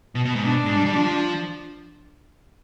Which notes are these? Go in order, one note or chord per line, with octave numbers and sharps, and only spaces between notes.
B2
B2
G#2
B2 D4
G#2
G3
G3
F3